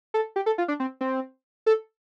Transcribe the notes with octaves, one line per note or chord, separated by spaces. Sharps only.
A4
G4
A4
F4
D4
C4
C4
A4